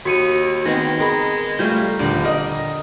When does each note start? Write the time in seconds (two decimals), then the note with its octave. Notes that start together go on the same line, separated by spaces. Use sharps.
0.05 D#2 F#4 C#7 D#7
0.65 D#3 G#3 B3 C4
1.00 G#4 A#4 D#5 B5
1.59 F3 G3 A3 F4 A#4 G6
1.99 D#1 D3 G3 A#4
2.25 A#4 D#5